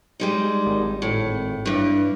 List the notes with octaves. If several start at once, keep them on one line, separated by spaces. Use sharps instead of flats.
G3 G#3 D#4
G#1
A2
G2 E3